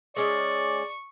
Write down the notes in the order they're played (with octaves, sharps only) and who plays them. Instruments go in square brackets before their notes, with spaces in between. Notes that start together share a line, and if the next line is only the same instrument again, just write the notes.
[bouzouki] G#3 C#4 D#5 [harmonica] D5 [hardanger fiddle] C#6